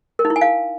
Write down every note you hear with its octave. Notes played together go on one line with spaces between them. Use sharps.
A#4
D#4
E4
G#5
F5